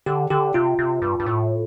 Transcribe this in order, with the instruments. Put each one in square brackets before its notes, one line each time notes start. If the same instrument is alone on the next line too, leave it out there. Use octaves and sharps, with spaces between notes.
[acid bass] D3 [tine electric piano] G4
[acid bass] D3 [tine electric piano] G4
[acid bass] C3 [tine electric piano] F4
[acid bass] C3
G2
G2
A2